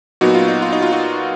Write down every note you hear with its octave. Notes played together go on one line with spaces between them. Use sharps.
A#2 F#3 B3 D#4 F#4
F4
D#4
F4
D#4
F4
D#4 F#4